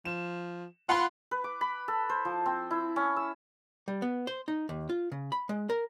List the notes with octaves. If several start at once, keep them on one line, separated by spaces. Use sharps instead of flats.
F3 E7
F4 F#5 B5 C6
B4
D6
B5
A4
C5
F3
C4
E4
C#4
E6
G3
B3
C5
D#4
D#2
F4
C#3
B5
G#3
A#4